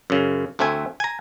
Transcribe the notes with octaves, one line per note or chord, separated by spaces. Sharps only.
F#2 C#3
D2 A3 C4 E5 G#5
G#5 A#5